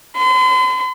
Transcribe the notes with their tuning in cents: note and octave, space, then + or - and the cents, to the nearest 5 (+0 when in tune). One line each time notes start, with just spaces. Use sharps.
C6 -45